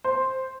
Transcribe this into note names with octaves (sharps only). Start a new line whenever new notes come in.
C5